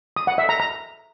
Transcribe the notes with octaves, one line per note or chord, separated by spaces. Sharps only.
D#6
F#5
E5
A#5
A#5